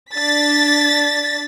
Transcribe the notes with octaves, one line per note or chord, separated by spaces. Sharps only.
D4 A6 B6